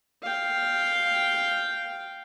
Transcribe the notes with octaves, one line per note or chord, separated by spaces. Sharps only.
F5 G5